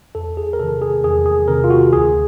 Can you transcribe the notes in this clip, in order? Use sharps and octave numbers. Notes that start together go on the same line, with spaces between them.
E2 A4
G#4
A#4
C3 D#3 A4
G#4
E2 G#4
G#4
C3 D#3 A#4
F4
F#4
D2 G#4